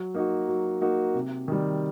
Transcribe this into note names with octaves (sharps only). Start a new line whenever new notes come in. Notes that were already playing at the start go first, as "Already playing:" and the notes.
Already playing: F#3
A#3 D#4 F#4
F#3
A#3 D#4 F#4
C3
D#3 G3